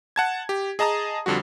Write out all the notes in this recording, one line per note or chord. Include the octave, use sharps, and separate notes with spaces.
F#5 A5 G#6
G4
G#4 D#5 A5 A#5 D#6
F2 D3 G3 F#4